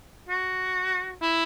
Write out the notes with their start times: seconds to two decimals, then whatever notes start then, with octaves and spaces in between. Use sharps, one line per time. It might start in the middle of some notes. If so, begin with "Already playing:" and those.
0.29 F#4
1.22 E4